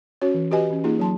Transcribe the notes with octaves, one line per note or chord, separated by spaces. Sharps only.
C#4 F#4 C#5
E3
F#4 G4 B4 D#5 G#5
E3 C#4
A#3 D#4 F4 G#4
F#3 A5 C6